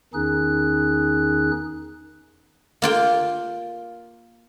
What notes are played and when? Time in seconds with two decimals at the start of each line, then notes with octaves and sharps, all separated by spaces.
0.14 E2 D#3 C#4 D#4 G#4 F#6
2.82 A#3 F4 G5